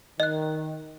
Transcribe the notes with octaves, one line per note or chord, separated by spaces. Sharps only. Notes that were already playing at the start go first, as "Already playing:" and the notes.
D#3 D#5 F#6